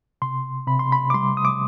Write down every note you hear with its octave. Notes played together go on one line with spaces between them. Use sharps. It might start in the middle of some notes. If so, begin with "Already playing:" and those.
C3 C6
C3 B5
C6
B5
D6
G3 C6
D#6
D6